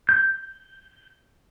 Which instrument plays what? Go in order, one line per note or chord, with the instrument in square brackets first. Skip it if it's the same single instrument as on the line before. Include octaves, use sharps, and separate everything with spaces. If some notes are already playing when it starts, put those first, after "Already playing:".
[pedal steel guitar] G6